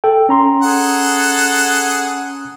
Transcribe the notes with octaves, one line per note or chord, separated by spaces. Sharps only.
A4 G5
C#4 A#5 C6
G#4 A4 F#5